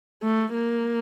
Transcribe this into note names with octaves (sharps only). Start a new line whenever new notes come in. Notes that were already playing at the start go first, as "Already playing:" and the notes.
A3
A#3